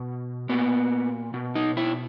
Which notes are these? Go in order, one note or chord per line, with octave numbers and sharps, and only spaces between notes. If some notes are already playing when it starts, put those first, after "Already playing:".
Already playing: B2
A#2 B3
B2
D#4
E4